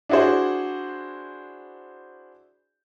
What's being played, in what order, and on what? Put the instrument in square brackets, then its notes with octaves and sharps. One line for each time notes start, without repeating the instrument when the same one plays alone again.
[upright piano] D4 E4 F#4 G#4 C5